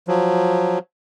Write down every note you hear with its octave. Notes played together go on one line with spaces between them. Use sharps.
F3 F#3